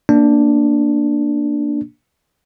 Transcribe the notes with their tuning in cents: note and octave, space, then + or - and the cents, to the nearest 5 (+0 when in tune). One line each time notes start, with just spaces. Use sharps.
A#3 +0 D4 +0